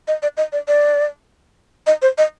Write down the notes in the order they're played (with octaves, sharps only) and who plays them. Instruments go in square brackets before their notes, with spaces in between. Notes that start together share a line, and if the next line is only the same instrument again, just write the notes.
[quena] D#5
D5
D#5
D5
D5
D#5
C5
D#5